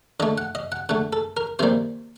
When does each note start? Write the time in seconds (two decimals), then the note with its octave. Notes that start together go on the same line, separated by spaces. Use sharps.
0.20 D3 A3 D#5
0.38 F#5
0.55 D#5
0.72 F#5
0.89 D3 A3 F#5
1.13 A4
1.37 A#4
1.59 C3 D#3 G3 A#3 C5